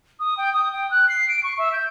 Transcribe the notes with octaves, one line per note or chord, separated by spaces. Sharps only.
D#6
G5
D#6
G5
F#6
C7
D7
C#6
E5
G6